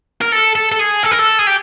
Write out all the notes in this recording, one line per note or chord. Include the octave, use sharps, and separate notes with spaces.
A#4
A4
A4
A4
G#4
A4
A#4
A4
G#4
G4